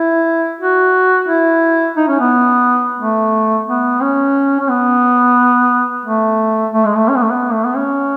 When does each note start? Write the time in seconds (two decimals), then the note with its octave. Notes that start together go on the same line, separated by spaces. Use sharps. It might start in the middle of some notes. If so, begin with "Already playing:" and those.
Already playing: E4
0.61 F#4
1.29 E4
1.97 D#4
2.08 C#4
2.20 B3
2.99 A3
3.68 B3
4.01 C#4
4.60 C#4
4.70 B3
6.06 A3
6.74 A3
6.85 G#3
6.96 A3
7.09 C#4
7.16 B3
7.23 A3
7.30 B3
7.52 A3
7.65 B3
7.76 C#4